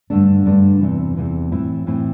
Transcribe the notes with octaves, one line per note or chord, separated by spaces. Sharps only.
G2 D3 A3 D4
G2 D3 A3 D4
E2 C3 E3
E2 C3 E3
A2 E3 C4 E4
A2 E3 C4 E4